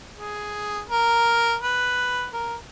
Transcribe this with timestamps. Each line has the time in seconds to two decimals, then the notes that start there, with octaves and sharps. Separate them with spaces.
0.17 G#4
0.90 A#4
1.62 B4
2.34 A#4